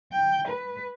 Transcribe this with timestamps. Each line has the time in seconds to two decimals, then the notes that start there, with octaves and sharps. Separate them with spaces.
0.12 G5
0.48 B4